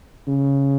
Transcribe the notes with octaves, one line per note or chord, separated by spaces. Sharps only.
C#3